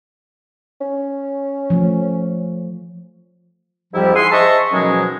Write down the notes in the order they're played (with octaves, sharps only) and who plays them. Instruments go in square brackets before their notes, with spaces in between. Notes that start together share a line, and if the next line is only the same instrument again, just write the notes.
[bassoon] C#4
[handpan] F3 A3
[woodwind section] F2 G#2 F3 G3 E4 G4
E4 G#4 F#5 G#5 C6
G#4 C5 D#5 E5 A5 C#6
B2 D#3 F3 F#3 G#3 C#4